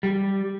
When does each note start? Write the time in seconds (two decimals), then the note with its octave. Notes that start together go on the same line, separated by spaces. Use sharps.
0.03 G3